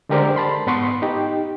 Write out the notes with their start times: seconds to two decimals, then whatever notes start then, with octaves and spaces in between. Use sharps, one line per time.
0.09 D3 G#3 G4 A#4 C5 D5
0.36 A5 B5 C6
0.67 G#2 B3 B4 C6 C#6
1.02 D#4 G4